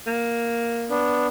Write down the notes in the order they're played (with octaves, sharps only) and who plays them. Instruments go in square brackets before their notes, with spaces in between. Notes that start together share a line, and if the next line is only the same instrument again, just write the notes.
[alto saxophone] A#3
[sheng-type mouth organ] B3 D4